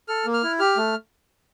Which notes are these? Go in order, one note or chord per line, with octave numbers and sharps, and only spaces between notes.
A4 F6
A#3
F6
E4
G4 F6
A3